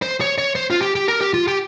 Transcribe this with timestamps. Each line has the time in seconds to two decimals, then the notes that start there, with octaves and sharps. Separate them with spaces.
0.02 C5
0.21 C#5
0.38 C#5
0.55 C5
0.70 F4
0.81 G4
0.95 G4
1.08 A#4
1.21 G4
1.34 F4
1.48 G4